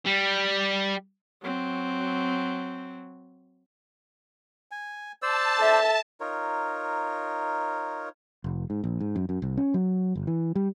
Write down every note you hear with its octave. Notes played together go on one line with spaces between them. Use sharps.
G3
F#3 C4
G#5
C5 D5 A5 E6
A4 E5
D#4 F4 A#4 C#5
F1
G#2
A#1
G#2
F#2
F#2
C2
C#4
F#3
G1
E3
G3